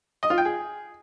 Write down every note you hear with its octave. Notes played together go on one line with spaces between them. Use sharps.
D#5
F4
G5
G#4